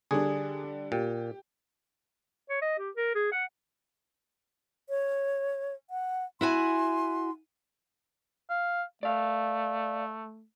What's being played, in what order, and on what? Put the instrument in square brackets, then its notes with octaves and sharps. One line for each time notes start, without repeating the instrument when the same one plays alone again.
[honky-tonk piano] D3 G3 D4 [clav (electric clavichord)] G#4
[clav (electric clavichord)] A#2 [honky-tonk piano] G4
[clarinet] C#5
D#5
G4
A#4
G#4
F#5
[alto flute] C#5
F#5
[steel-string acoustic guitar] E4 F#4 G#5 [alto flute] C6
[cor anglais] F5
[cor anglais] A3 [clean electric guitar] D5 F5